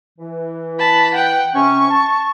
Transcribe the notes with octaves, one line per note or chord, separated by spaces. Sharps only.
E3
A5 B5
F#5 G5
C3 C#4 C#6
A5